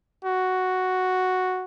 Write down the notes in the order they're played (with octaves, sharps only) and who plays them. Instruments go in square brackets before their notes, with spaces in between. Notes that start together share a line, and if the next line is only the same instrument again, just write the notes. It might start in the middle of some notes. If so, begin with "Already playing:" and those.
[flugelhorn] F#4